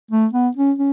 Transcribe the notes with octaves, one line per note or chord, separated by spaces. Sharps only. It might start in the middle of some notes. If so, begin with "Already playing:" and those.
A3
B3
C#4
C#4